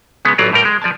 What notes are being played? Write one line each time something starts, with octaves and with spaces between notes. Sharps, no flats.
C#3 G#3 B3
A1 E3 F#3 F4 D5 A#5
A2 G3 A#4 G5
G#3
F3 D5 G#5 A5